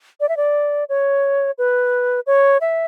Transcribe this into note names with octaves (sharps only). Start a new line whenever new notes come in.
D5
E5
D5
C#5
B4
C#5
E5